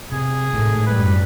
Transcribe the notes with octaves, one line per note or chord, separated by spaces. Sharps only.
C3 G#4
G#1 A2 A3
F#2 G3 B4